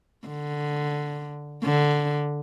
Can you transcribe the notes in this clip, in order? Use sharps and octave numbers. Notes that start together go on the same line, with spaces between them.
D3
D3